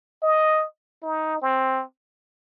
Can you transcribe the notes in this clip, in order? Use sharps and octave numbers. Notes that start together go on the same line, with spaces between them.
D#5
D#4
C4